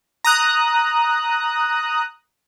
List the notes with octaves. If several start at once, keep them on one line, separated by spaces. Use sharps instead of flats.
A#5 D#6 F#6